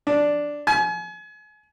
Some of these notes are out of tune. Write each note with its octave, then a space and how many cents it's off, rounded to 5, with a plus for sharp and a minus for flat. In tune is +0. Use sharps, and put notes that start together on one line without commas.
D4 -5
G#5 +35